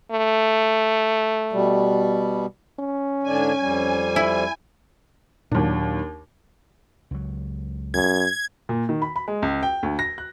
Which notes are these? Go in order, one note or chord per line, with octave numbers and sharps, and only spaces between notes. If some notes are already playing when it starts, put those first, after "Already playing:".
A3
B2 G3
C#4
G#2 D3 D4 G#5
F2 G3
E4
D#2 A#2 F#3 D4
C#2 F#3
F#2 G#6
A#2
D#3
B5
B5
G#3
C#2
G5
D2
A#6
F#6